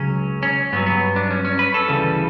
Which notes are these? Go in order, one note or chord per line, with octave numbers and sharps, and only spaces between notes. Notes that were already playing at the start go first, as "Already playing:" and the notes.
Already playing: C#2 C#3 F#3 C#4
C#4
G2 F#3 B3
B3
D4
C#4
C#4
B4
A4
D2 C#3 E3 G3